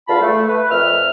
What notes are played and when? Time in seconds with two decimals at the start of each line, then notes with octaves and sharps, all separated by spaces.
0.08 E2 D3 F4 F5 A5 B5
0.21 A3
0.48 B4
0.70 F2 A#2 E5 F6